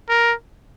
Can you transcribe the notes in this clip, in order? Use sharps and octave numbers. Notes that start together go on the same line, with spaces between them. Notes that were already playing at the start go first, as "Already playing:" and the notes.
A#4